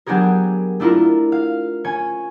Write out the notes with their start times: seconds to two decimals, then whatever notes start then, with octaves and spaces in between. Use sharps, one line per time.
0.06 F#3 B3 D4 G4 G#4 A#4
0.80 A3 D4 E4 F4 A#4
1.32 F5
1.84 C#4 C#5 G#5